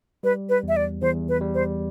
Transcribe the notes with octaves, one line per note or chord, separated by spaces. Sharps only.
G3 B4
B4
E2
E5
D5
E2 C5
B4
G3
C5